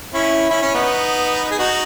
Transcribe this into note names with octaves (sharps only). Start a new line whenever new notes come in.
C#4 E4
C#4 E4
C#4
B3 D#4
G#4
D#4 F#4